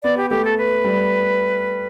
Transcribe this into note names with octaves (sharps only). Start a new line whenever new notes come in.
B3 D5
G4
A3 G4
A4
B4
G3